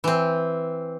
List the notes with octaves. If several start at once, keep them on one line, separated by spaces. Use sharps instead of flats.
E3 C4